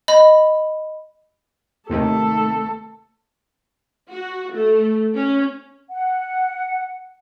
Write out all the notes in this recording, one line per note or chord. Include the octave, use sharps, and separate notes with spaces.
D#5 B5
D#2 C3 D#3 A3 A4
F#4
A3
C#4
F#5